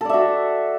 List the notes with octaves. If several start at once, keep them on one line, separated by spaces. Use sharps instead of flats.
F#4 A4 D5 E5